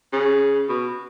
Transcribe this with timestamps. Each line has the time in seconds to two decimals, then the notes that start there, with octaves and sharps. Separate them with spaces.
0.13 C#3
0.69 B2